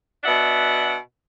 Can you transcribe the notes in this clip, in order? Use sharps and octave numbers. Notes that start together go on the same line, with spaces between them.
B2 D4 E5 F#5